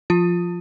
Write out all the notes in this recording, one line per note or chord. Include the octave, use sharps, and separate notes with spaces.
F3 F4